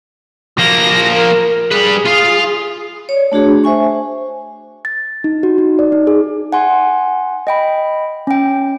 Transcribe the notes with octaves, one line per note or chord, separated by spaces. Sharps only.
F3 A#3 A#6
A#4
G3 G#4 B4
F4 F5
C#5 D5
A3 D4 F#4 G#4
C5 E5 G#5 C#6
A6
D#4
F#4
D#4
D5
D#4
G#4
F#5 G#5 C6
D#5 G5 B5
C#4 G5